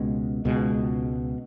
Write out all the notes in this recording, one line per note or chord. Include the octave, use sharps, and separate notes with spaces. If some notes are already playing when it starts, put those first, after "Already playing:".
Already playing: C#2 B2 G#3
C#2 B2 G#3